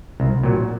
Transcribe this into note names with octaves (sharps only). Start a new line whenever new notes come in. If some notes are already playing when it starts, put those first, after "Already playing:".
C2
A#2 F#3